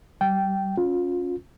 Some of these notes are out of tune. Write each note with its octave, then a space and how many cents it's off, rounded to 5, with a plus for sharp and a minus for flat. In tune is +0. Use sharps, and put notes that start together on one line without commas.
G3 -30 G5 -10
C#4 +0 F4 +25